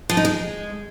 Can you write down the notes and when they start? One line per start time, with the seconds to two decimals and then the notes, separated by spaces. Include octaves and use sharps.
0.10 F3
0.17 D#4
0.25 G#3